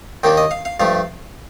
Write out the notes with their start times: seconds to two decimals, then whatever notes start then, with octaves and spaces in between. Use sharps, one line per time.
0.23 D#2 D#3 A#3 D4 G5
0.37 D#5
0.51 F5
0.65 F5
0.80 G2 F3 A3 F5